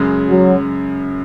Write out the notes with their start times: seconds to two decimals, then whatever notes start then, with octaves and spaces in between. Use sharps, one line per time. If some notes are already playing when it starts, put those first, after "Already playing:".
Already playing: F#2 C#3 G#3
0.28 F#3